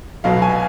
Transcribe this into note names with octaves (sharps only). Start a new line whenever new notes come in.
B1 B2 F#3 F5
G#5